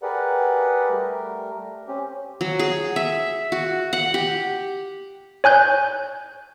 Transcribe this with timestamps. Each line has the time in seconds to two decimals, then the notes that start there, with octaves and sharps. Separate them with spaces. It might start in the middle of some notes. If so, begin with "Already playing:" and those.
0.03 G4 G#4 A#4 B4 D5 F#5
0.90 G3 A3 A#4
1.88 C4 C#4 G4
2.41 F#3
2.59 G#4
2.96 E5
3.52 F#4
3.93 F#5
4.14 G4
5.44 C#5 G#5 F#6 G6